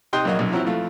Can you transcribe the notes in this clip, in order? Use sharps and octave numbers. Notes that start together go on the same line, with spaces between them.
C3 D#4 G5 C6 D#6 F#6
A#1 F#2 F#3 A#3 C#5 D#5
B1 F#2
F3 F#3 C4 E4
F2 E3 A3 F4